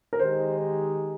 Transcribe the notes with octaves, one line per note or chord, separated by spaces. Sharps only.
A#4
D#3 G#3 D#4 G4 C5